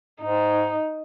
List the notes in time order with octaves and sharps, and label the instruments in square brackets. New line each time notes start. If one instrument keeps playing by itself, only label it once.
[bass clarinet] G#2 [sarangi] D#4